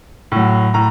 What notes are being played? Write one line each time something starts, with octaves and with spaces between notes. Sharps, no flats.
A2 F#3
A2 A#5